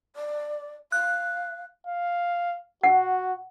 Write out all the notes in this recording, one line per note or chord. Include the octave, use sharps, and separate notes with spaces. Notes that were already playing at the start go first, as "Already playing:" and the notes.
D5
F5 F#6
F5
F#4 F#5